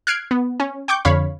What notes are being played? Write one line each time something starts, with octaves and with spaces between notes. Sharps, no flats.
F6 F#6 G#6 C7 D7
B3
C#4
G5 C#6 D6 G6
F2 D3 C#5 F5 B5